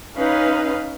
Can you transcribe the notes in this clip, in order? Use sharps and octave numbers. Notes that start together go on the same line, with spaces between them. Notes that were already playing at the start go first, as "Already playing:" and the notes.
C#4 D#4 B4 F5